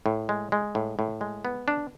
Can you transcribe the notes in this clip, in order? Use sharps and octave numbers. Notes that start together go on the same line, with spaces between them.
A2
G#3
G#3
A2
A2
G#3
B3
D4